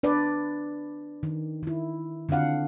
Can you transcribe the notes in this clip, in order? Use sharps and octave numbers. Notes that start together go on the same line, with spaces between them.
D4 B4 D5
D#3
D#3 E4
D3 C4 D4 F5 F#5